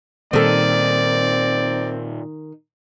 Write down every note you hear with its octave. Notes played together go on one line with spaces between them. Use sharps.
A#2 D#3 G3 C4 A4 D5